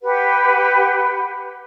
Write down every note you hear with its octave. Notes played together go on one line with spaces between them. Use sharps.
G4 B4 F#5